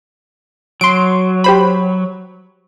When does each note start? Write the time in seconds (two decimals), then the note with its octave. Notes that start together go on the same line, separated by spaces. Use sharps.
0.81 F#3 C6 D7
1.44 G4 C5 B5